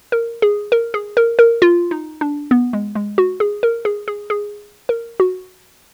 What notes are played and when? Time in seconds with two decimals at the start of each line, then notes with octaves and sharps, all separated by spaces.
0.12 A#4
0.42 G#4
0.72 A#4
0.94 G#4
1.17 A#4
1.39 A#4
1.62 F4
1.91 D#4
2.21 D4
2.51 B3
2.73 G#3
2.95 G#3
3.18 F#4
3.40 G#4
3.63 A#4
3.85 G#4
4.08 G#4
4.30 G#4
4.89 A#4
5.20 F#4